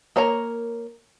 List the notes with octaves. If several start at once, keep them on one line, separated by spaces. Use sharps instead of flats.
A#3 A#4 C#5 A#5